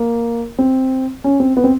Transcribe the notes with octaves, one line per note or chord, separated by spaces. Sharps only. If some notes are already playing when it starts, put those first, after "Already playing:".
Already playing: A#3
C4
C#4
C4
B3
C4